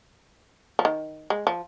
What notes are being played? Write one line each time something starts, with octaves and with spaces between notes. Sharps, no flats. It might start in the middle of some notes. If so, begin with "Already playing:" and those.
F3
D#3
G#3
F3